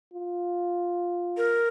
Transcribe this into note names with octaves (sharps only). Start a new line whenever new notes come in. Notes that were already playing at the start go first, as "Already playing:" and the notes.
F4
A#4